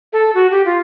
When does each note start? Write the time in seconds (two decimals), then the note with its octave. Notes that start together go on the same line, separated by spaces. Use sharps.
0.13 A4
0.35 F#4
0.51 G4
0.66 F4